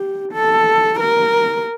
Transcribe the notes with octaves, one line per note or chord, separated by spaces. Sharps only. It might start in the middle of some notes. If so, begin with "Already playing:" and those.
Already playing: G4
A4
A#4